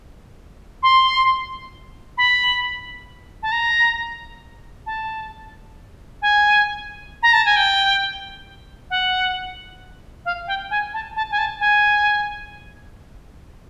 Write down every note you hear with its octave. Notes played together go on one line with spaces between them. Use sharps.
C6
B5
A5
A#5
A5
G#5
A#5
A5
G#5
G5
F#5
F5
G5
G#5
A5
A5
G#5
A5
G#5